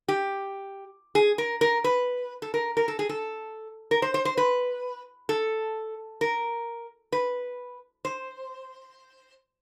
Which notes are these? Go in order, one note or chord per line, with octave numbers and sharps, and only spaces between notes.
G4
G#4
A#4
A#4
B4
A4
A#4
A#4
A4
G#4
A4
A#4
C5
C5
C5
B4
A4
A#4
B4
C5